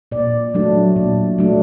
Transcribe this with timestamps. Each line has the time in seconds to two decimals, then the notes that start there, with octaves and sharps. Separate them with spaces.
0.12 A#2 D5
0.54 F#3 A3 D4
0.96 A#2
1.39 F#3 A3 D4